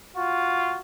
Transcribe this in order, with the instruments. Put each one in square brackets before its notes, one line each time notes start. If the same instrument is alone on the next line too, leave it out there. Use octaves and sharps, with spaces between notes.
[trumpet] F4 [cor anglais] F#4